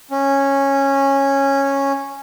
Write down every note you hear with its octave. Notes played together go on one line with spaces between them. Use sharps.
C#4